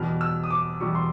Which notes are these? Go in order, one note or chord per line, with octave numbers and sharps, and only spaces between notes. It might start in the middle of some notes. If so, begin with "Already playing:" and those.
Already playing: E2 B2 G3 F6
E6
D#6
D6
E2 B2 G3 C#6
C6